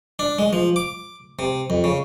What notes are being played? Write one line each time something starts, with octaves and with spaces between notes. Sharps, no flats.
D4
G#3
F3
D6
C3
F2
C#3